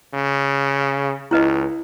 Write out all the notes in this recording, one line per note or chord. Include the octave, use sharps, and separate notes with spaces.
C#3
C#2 E4 B4 D#5